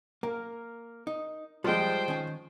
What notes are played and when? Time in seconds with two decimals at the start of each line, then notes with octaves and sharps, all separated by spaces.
0.23 A#3 A#4
1.07 D#4
1.64 F3 G3 G#3 C5 G5
2.08 D#3 C#4 G#5